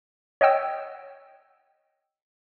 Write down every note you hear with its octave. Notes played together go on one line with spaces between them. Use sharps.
C#5 D#5 F#5 G5 E6